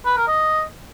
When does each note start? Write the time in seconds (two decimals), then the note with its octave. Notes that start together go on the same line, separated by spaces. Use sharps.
0.06 B4
0.17 A#4
0.28 D#5